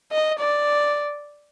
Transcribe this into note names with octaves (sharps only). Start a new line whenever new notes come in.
D#5
D5